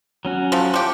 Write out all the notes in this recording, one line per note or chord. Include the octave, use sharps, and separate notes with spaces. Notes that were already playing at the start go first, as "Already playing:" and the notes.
F#3 C#4 F#4
F3 A3
F3 G4 C#6